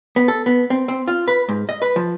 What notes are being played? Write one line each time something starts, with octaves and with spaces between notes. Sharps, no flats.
B3
A4
B3
C4
C4
F4
B4
G#2
D#5
B4
F3